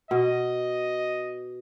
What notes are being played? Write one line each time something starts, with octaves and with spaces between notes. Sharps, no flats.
B2 D#5